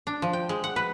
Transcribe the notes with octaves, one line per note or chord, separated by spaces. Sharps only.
D4
F3
G5
G#3
F#5
B4